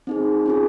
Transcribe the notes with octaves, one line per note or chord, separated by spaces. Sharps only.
C4 D#4 G#4
C#4 F4 G#4